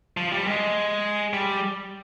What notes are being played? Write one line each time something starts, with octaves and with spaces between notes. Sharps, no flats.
F3
G3
G#3
G3